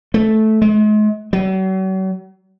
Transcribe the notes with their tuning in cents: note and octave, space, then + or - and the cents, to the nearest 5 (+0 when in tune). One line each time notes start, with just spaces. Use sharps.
A3 -10
G#3 +40
F#3 +40